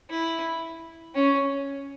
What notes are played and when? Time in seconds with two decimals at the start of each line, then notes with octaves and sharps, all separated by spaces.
0.09 E4
1.14 C#4